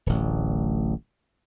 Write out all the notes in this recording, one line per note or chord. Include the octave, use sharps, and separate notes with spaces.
D1 A1